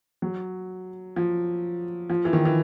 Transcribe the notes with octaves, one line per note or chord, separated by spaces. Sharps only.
F#3
F3
F3
E3
D#3
E3